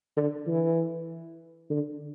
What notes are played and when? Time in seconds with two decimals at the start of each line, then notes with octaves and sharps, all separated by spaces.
0.16 D3
0.47 E3
1.70 D3